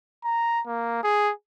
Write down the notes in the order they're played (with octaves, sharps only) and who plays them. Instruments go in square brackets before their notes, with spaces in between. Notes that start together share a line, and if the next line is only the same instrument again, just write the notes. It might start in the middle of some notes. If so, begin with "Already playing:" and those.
[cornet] A#5
A#3
G#4